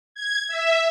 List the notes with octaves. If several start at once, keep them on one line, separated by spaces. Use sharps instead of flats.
G#6
E5